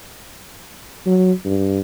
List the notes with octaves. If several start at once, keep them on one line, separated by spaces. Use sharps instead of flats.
F#3
G2